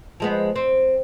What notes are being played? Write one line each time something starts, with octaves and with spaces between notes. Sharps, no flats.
F3 G#3 B3
C4